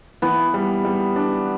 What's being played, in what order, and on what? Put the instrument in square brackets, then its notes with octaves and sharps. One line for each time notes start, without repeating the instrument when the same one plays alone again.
[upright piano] E3 [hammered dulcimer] B3
[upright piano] G3
G3
D4